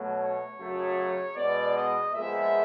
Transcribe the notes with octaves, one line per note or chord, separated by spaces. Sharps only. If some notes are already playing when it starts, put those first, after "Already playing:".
Already playing: B2 F#3 A3
C#5
F#2 C#3 F#3 A3
B2 G#3 B3 D5
D#5
A#2 F3 G#3 B3 E5